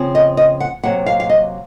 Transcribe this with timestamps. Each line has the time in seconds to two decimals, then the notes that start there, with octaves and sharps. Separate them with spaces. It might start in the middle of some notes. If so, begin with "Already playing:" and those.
Already playing: C#3 F3 C4
0.15 D#5
0.37 D#5
0.60 F#5
0.83 C3 F#3 A#3 F#5
1.06 F5
1.20 F5
1.29 D#5